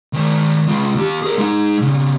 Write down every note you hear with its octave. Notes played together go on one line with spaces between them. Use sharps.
D#3 C5
G#3 F4
D#2 G4
G#4 A#4
G#3 D#4
C#3 C4